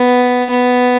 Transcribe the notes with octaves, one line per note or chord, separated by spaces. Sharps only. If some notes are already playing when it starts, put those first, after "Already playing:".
Already playing: B3
B3